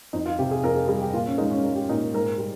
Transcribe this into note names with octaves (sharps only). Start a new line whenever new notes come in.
F2 D#4
F4
C3 G4
G#4
F2 A#4
G#4
G3 G#4
G4
A#2 F4
C#4
G#3 D#4
C#4
G#3 D#4
G4
A#2 D#4
A#4
G#2 A#4
G3